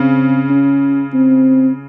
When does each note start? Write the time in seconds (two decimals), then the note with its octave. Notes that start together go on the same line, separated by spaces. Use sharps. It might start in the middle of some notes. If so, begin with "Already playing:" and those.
Already playing: C#3 C4
0.50 C#4
1.14 C4